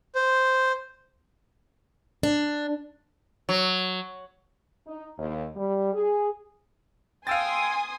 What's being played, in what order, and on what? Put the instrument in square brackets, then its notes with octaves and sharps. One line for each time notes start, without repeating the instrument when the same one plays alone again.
[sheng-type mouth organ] C5
[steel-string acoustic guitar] D4
[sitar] F#3
[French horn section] D#4
D#2
G3
G#4
[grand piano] F5 E6 A6 [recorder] G5 [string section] G#5 C6 D#6